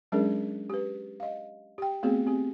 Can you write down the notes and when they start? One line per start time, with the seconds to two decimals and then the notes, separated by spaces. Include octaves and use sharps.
0.12 F#3 G#3 C#4 D4 G#4 A#4
0.70 G4 B4
1.20 D#5 F5
1.78 G4 G5
2.03 A3 B3 C4 F#4 G#4
2.27 C4 G4